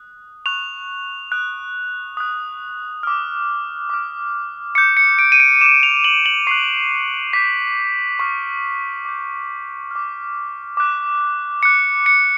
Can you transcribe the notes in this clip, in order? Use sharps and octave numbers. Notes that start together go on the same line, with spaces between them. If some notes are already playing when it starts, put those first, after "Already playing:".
Already playing: D#6 F#6
C#6 F#6 F7
D#6 F#6
D#6 F#6
D6 F6
D6 F6
D6 G6 C#7
C#7
D7
D#7
D7
D6 G6 E7
F7
F#7
F#7
C#6 F#6 C7
D6 G6 B6
C#6 F6
D6 G6
D6 F6
D6 F#6
D6 F#6 C#7
C#7